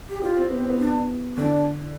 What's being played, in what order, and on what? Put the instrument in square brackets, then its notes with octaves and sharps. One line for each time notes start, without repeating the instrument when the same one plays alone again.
[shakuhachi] G4
[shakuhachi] F4 [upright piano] G4
[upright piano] C4
B3
C4
B3
[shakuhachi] D4
[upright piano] D3 [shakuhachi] D4